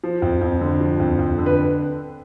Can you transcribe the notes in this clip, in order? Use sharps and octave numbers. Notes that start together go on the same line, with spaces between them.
F3
F2
F2
D3
F3
F2
F2
D3
B4